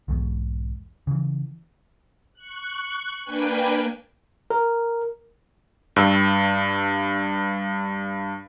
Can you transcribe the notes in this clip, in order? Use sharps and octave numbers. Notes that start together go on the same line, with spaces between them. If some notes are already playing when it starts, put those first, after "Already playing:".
B1 E2 G#2 B2
C#3 E3
C#6 F#6
A#3 D4 B4 G5 G#5
A#4
G2 E6